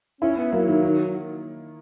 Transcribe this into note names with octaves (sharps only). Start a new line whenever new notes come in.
C#4 E4
B3
F#3 A#3
D#3
D#3